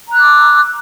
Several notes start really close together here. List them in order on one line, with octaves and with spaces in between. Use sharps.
A#5 F#6 E6 D6